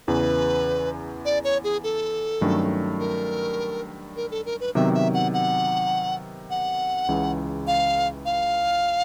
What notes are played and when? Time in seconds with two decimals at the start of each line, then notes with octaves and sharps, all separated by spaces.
0.08 E2 C#3 E3 B4
1.25 D5
1.44 C#5
1.64 G#4
1.84 A4
2.41 G2 D#3 F#3 A3 C#4
3.00 A#4
4.16 A#4
4.31 A4
4.46 A#4
4.60 B4
4.75 C3 D#3 F#3 B3 E5
4.95 E5
5.14 F#5
5.33 F#5
6.50 F#5
7.09 C#2 C#3 E3
7.67 F5
8.25 F5